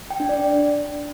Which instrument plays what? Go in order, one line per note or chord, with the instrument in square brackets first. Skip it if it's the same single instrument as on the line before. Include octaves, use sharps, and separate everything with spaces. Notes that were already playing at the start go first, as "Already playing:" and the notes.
[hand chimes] G5
D4
D5